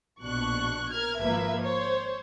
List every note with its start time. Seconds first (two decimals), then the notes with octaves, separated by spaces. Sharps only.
0.20 A#1 B2 D4 C#6 F#6
0.90 A#4 F6 G#6
1.19 G#1 F3 A#3 B4 E5 G#6
1.61 C5 C#5